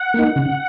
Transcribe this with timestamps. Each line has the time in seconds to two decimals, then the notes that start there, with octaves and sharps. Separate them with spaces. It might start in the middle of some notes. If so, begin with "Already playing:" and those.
Already playing: F#5
0.14 A#3 D#4
0.36 C#3